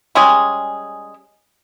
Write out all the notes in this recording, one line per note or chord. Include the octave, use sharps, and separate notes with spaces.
G3 G#3 C#4 G#4